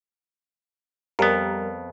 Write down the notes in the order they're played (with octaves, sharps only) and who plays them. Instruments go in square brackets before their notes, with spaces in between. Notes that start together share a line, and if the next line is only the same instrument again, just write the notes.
[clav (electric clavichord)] F2 B3 [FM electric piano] G3 A#4